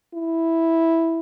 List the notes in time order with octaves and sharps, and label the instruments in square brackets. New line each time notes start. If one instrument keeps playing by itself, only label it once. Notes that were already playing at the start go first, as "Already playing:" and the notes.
[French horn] E4